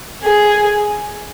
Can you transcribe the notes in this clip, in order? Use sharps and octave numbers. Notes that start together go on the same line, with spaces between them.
G#4